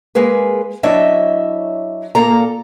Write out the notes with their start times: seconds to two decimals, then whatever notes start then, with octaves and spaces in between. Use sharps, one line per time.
0.15 G#3 A#3 G#4 B4
0.83 F#3 D4 E4 C#5 D#5 E5
2.15 A#2 A#3 A4 A#5